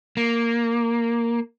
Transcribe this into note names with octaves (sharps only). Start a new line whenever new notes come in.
A#3